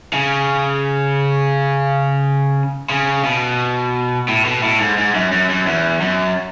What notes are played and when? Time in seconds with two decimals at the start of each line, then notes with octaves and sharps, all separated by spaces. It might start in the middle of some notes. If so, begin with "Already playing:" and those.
0.13 C#3
2.90 C#3
3.24 B2
4.28 A2
4.45 B2
4.63 A2
4.80 G#2
4.98 G#2
5.15 F#2
5.32 F#2
5.49 F#2
5.67 E2
6.01 F#2